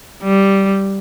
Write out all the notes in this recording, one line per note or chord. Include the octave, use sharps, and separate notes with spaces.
G3